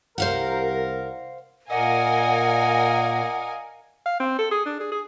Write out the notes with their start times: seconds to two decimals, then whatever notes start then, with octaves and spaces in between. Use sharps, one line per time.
0.18 C2 A#4 C5 F5 F#5
1.70 A#2 A#4 D5 D#5 F5 F#5 G#5
4.06 F5
4.20 C4
4.39 A4
4.51 G#4
4.66 D4
4.80 G#4
4.92 G#4